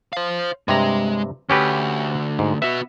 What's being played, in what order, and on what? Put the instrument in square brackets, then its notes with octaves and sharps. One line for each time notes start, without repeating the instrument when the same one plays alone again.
[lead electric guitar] C5 F5
[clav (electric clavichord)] G2 C3 A#5 [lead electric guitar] G#3
[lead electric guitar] D2 [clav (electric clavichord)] C#4 G4 B4
[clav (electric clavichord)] G#2
[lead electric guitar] B3 F#4 [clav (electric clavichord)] E5